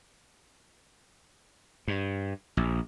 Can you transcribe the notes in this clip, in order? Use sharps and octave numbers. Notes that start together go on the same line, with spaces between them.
G2
A#1